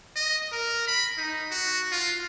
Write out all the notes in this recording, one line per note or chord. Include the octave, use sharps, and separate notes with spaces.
D#5
A#4
B5
D#4
F#4
F4